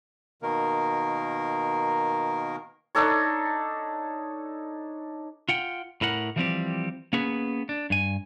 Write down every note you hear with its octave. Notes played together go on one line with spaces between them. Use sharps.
B2 D#3 A#3 A#4
D4 D#4 A4 C#5
F4 F#5 G5
A2 E4 A#4 F#5
E3 F3 G3 A#3 C4 G4
A#3 B3 C#4 G#4 B4
D4
G2 G#5